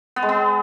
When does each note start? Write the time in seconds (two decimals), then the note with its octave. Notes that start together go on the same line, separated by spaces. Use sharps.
0.16 B3
0.23 G#3
0.29 B3